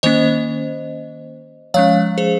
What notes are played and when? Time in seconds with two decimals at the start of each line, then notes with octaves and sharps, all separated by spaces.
0.03 D#3 A#3 C#4 C5 D#5
1.74 F3 G#3 C#4 C#5 F5
2.18 G#4 C5